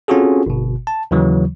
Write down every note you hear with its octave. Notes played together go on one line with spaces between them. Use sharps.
C4 C#4 F4 F#4 G#4 A4
G1 B2
A5
D#2 C#3 E3 F#3